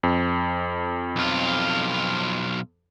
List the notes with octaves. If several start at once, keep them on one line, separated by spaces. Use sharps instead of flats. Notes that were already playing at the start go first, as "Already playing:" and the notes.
F2
B1 F4